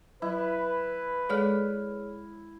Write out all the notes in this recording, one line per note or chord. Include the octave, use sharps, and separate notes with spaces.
F#3 E4 B4
G#3 G#4 A4 C#5 D5 F6